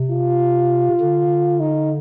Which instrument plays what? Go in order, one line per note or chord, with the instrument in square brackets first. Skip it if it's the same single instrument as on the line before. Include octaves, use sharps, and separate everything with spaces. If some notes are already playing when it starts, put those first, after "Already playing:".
Already playing: [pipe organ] C3
[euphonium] F4
[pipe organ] D3
[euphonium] D#4